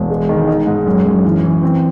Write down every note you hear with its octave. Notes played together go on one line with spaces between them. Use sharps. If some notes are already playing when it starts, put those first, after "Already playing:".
Already playing: E1
G#3
D#3
D#4
G#2
F#2
F#2
E3
E3
C4